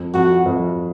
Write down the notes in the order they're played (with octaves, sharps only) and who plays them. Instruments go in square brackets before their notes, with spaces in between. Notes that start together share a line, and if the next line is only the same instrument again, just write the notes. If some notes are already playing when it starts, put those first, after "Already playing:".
Already playing: [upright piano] F2
[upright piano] F2 [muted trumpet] F#4
[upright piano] F2